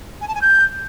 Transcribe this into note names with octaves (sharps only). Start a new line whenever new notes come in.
G#5
A5
G#5
G6